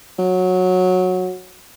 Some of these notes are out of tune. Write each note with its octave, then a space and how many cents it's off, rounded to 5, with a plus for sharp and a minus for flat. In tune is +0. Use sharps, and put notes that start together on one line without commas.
F#3 -15